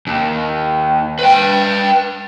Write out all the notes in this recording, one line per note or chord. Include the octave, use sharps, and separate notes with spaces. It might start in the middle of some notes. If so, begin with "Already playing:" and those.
D#2
B4 G5